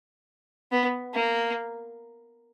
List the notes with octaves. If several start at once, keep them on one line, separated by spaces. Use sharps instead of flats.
B3
A#3